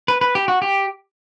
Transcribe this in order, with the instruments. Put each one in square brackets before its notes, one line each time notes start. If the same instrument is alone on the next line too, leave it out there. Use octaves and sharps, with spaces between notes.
[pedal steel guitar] B4
B4
G4
F#4
G4